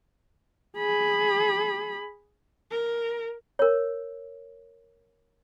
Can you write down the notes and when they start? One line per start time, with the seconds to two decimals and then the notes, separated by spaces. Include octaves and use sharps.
0.77 G#4 B5
2.71 A#4
3.59 A#4 C#5